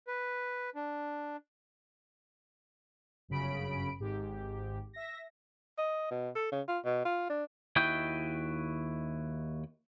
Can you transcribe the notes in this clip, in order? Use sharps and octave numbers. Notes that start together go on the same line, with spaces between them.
B4
D4
G1 F#2 C#3 B5 D7
G#1 G#2 G4
E5 A#6
D#5
B2
A4
C#3
F4
B2
F4
D4
D#2 E4 F#4 D#5 G5